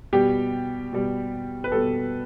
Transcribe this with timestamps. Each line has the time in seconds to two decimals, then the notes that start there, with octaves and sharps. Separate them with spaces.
0.13 B2 G3 G4
0.93 B2 G3
1.64 B4
1.72 B2 G3 A4